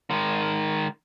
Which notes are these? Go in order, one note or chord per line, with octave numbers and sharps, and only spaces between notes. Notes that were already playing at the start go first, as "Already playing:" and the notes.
D#3 G#3